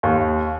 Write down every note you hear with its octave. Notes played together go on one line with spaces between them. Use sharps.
D#2